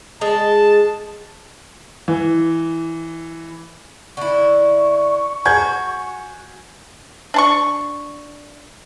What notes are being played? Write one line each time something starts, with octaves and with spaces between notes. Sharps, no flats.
G#3 A5
E3
D3 E4 C#6
F#4 G#5 G6 G#6
D4 A5 C#6